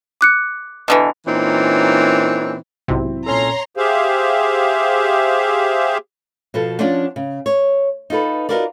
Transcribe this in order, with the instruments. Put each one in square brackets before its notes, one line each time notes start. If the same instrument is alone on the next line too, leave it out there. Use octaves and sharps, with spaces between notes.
[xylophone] D6 F#6 C#7
[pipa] B2 D3 E3
[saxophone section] A#2 E3 C4 C#4 D#4
[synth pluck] B1 G#2 C3 [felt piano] F#3 C4 E4
[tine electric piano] A#2 C#4 A4 [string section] C#5 A#5 C6
[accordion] G4 G#4 C5 E5 F5
[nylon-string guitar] B2 F3 A4
F3 C#4 D4 C5 D5 F#5
C#3
C#5
D#4 F4 A4 B4
D#4 F4 F#4 A#4 B4 D5